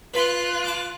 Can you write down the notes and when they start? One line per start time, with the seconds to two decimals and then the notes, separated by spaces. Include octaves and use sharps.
0.14 F4 B4 B5 C6 F#6
0.64 A5 D6